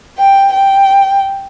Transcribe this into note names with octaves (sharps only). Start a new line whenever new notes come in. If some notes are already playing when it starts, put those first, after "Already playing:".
G5
G5